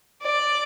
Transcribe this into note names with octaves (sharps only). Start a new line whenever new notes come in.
D5